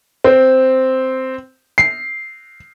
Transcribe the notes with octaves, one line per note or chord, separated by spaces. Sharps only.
C4
C7